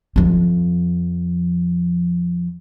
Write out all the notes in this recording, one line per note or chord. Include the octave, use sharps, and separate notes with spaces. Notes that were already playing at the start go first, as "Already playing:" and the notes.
F2 F3